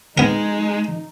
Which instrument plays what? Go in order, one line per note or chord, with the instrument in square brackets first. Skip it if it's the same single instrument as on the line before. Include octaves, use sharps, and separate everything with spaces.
[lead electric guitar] G#3 [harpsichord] B3 A#4 [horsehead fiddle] D#4